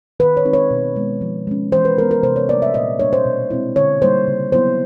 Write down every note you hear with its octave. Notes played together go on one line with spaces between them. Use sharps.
D#3 B4
C#5
G#3 C4 D#4
C#5
B2
G#3 B3
F3
G#3 C#4
E3 C5
B4
G#3 B3 A#4
A#4
C3 C5
C#5
E3 G3 A#3 D4 D5
E5
A#2 D#5
G3 A#3 D4 C#5
C5
B2
G#3 C4 E4
D3 C#5
G3 A#3 D#4 C5
C#3
F#3 B3 E4 C5